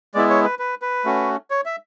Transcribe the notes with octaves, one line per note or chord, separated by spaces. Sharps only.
G#3 B3 E4 D5
C#5
B4
B4
B4
A3 C#4 F#4
C#5
E5